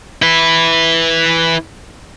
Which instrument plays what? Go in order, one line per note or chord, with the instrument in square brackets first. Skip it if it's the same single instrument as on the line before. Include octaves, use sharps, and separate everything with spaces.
[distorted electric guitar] E4 B4